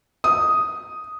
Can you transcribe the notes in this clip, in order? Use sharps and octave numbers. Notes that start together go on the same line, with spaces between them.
D#6